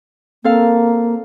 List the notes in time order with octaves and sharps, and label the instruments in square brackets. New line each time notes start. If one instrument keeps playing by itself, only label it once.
[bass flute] A#3 [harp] C4 A4 F5